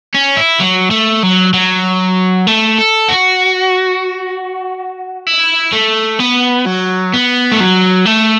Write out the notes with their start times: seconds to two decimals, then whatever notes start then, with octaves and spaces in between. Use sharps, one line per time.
0.14 C#4
0.36 E4
0.60 F#3
0.91 A3
1.23 F#3
1.53 F#3
2.47 A3
2.79 A4
3.08 F#4
5.27 E4
5.73 A3
6.20 B3
6.66 F#3
7.14 B3
7.52 A3
7.60 F#3
8.06 A3